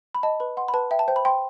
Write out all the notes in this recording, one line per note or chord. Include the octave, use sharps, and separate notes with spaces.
B5
D#5 A5
B4 B5
F#5 C6
B5
B4 A5
E5 G5
A5
C5 G5
B5
G5 C6